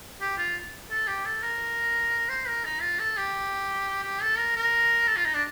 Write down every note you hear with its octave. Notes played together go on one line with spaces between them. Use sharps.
G4
F4
A4
G4
A4
A#4
C5
A#4
D#4
F4
A4
G4
G4
A4
A#4
A#4
A4
F4
D#4
D4